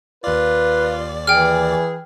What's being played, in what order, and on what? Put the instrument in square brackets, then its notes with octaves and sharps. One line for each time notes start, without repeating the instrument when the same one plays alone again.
[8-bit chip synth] D#2 D5 [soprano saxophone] F4 [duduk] B4
[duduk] E3 [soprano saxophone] G#4 [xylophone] G5 F6